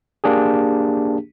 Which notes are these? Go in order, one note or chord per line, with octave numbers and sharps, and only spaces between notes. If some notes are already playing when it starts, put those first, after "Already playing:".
A#3 D4 G4 G#4